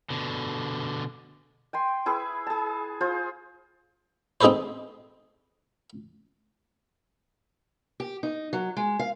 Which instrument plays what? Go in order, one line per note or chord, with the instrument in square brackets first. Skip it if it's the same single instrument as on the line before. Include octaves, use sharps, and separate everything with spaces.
[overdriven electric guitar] B2 D3
[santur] G5 G#5 C6
E4 G#4 B4
G#4 A5
F4 G#4 C5
[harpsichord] C4 D#4 G#4 A4 B4 C5
[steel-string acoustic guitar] G4
D#4
F#3
G#3
F5